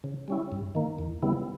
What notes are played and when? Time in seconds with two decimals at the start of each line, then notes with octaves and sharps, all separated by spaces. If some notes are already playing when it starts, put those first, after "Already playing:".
0.04 C#3
0.28 G3 C#4 E4
0.52 G2
0.75 D#3 A#3
0.99 E2
1.22 C#3 G3 B3 E4